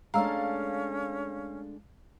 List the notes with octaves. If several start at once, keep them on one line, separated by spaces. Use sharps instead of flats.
G#3 A3 C#4 D4 F5 A#5 E6